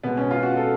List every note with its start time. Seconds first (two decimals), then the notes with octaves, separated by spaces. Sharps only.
0.04 B2 G#3 B3
0.17 C#4
0.31 F4
0.43 F#4
0.57 A4